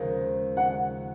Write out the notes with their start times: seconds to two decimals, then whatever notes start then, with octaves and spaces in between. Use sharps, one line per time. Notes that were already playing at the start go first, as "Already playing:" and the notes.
Already playing: D#2 C#3 F3 G#3
0.57 F#5